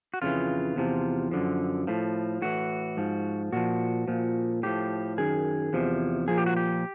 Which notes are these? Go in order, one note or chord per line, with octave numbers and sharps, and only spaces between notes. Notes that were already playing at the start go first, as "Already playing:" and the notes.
F#4
F2 C#3 E3 F4
E2 C3 F3
F#2 D3 F3
A2 F3
A2 E3 F#4
G#2 F3
A#2 F3 F#4
A#2 F3
A2 F3 G4
F#2 D#3 G#4
E2 C3 F3
A#2 F3 G#4
G4
F#4
G4